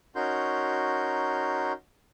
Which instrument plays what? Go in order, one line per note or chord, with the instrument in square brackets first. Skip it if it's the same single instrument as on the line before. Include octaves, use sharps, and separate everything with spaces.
[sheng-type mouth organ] C#4 D#4 F#4 A#4 C6 G6